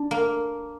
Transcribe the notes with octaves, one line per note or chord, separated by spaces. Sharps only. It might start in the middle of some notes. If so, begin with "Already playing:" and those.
Already playing: D4
A#3